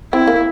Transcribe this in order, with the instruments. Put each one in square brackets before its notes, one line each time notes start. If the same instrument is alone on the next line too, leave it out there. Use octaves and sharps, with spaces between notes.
[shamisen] C4 [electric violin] E4
[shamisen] A#3